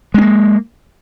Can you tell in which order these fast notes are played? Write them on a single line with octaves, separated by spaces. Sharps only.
G#3 C#4 A#3